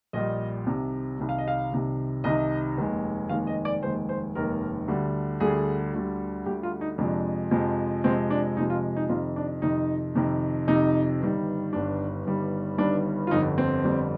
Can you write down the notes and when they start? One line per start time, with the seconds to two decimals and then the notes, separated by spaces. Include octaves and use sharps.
0.13 A#1 A#2 G3 D#5
0.66 C2 C3 D#3
1.19 C2 C3 D#3
1.29 F5
1.38 D#5
1.48 F5
1.71 C2 C3 D#3
2.24 C2 C3 D#3 D#5
2.77 F1 D#2 D#3 G#3
3.29 F1 D#2 D#3 G#3 F5
3.47 D#5
3.65 D5
3.82 F1 D#2 D#3 G#3 C5
4.09 C5
4.35 F1 D#2 D#3 G#3 A#4
4.88 D2 D3 G3
5.40 D2 D3 G3 G#4
5.93 D2 D3 G3
6.46 D2 D3 G3 G4
6.63 F4
6.81 D#4
6.98 F2 C3 F3 G#3 D4
7.51 F2 C3 F3 G#3
8.04 F2 C3 F3 G#3 C4
8.30 D4
8.57 F2 C3 F3 G#3 D#4
8.70 F4
8.96 D#4
9.09 F2 C3 D#3 F4
9.36 D4
9.62 F2 C3 D#3 D#4
10.15 F2 C3 D#3
10.67 F2 C3 D#3 D#4
11.20 G1 G2 D#3 G3
11.73 G1 G2 D#3 G3 D4
12.25 G1 G2 D#3 G3
12.78 G1 G2 D#3 G3 D4
13.27 F4
13.31 G1 F2 D3 G3 D#4
13.58 C4
13.84 G1 F2 D3 G3